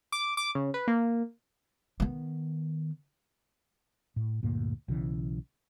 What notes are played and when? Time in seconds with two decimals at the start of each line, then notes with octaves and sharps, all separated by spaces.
0.12 D6
0.37 D6
0.55 C#3
0.74 B4
0.88 A#3
2.00 D#3 B3
4.16 A2
4.43 D2 G2 A#2 A#3
4.88 B1 C#3 E3